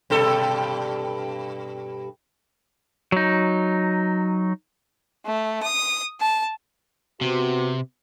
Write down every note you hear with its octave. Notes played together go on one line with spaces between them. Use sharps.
G2 B2 A4
F#3 D#4
A3
D#6
A5
C3 B3 F#4 C5